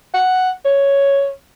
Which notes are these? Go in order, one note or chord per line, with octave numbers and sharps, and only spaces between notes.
F#5
C#5